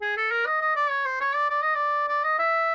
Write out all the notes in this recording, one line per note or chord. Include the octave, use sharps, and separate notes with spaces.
G#4
A4
A#4
D#5
D#5
D5
C#5
C5
C#5
D5
D5
D#5
D5
D5
D#5
E5